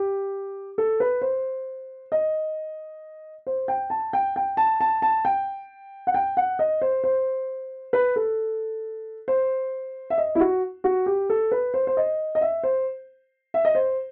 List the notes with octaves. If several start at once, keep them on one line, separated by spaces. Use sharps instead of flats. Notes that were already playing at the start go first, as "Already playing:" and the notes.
Already playing: G4
A4
B4
C5
D#5
C5
G5
A5
G5
G5
A5
A5
A5
G5
F#5
G5
F#5
D#5
C5
C5
B4
A4
C5
E5
D#5
E4
F#4
F#4
G4
A4
B4
C5
C5
D#5
D#5
E5
C5
E5
D#5
C5